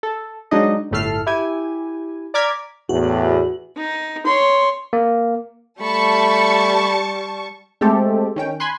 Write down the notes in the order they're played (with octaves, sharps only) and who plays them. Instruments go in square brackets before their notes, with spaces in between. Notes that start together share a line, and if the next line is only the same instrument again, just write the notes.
[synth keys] A4
F#3 G#3 D4 D#4 D#5
G1 A2 A3 A4 F6 C7
E4 G4 G#5
D5 A#5 D6 F6 G#6 B6
[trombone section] E2 A2 [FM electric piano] F#4
[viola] D#4
C#5 C6
[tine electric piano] A#3
[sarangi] G3 [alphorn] A3 [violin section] A5 C#6 [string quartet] B5
[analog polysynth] G#3 A3 C4 G4 A4
D#3 C#4 G5
G#5 B5 C6 F#6